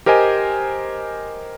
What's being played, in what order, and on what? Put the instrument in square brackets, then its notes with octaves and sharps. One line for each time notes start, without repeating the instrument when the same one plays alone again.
[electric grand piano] G4 A#4 C5 D#5 G#5